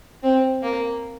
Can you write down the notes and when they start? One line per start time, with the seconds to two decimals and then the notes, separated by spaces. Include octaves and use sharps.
0.23 C4
0.63 A#3